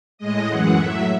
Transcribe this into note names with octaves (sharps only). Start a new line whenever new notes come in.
A2 G#3 D#5
F#2 E3 G#3 F#5
A2 F#3 E5